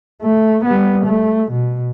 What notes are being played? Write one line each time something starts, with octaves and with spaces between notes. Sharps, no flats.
A3
G3 B3
A3
B2